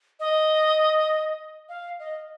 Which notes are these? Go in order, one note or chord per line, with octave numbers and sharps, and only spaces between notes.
D#5
F5
D#5